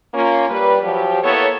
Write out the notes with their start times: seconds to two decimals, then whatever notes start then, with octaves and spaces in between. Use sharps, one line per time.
0.14 A#3 C#4 F4
0.49 G3 B4
0.83 F3 F#3 G4
1.22 A#3 B3 E4 A4 C#5